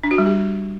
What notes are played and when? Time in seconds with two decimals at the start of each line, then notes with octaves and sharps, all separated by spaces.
0.04 D4
0.11 F#4
0.18 G3
0.26 G4